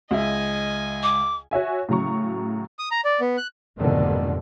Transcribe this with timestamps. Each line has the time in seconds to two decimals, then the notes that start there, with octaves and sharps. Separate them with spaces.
0.11 C#2 D#5 E5 G#5
1.03 D6
1.51 F#4 C#5 E5 G#5
1.89 A2 C#3 F#3 A#5 C#6
2.79 D#6
2.91 A#5
3.05 D5
3.20 B3
3.38 F#6
3.78 F1 G#2 B2 D3 D#3